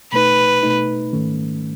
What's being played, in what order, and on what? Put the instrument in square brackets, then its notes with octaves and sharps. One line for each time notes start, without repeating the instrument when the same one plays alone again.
[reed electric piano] B2 A3 D#4 [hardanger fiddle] B4
[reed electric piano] B2 A3 D#4
G#2 D#3 A3 C#4